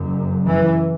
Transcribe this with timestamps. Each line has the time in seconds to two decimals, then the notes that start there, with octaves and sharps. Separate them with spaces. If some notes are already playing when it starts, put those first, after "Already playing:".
Already playing: F#1 F#2
0.46 E3